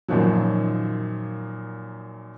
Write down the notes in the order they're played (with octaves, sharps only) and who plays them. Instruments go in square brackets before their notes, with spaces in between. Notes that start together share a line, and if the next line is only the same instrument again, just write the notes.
[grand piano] F#2 A#2 D#3 F3 F#3